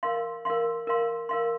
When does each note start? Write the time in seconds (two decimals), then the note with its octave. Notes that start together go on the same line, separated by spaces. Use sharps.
0.03 A#4 F5 C6
0.45 A#4 F5 C6
0.87 A#4 F5 C6
1.29 A#4 F5 C6